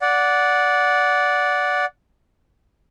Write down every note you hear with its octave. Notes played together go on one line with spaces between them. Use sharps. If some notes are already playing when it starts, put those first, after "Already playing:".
D5 F#5